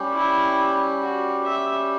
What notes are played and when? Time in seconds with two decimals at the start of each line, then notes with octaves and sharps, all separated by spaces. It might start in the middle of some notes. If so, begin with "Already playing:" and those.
Already playing: G3 C#4 G4
0.13 E4
1.01 F#4
1.44 E5